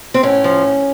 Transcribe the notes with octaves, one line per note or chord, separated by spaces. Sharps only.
C4
A2 C#4
F3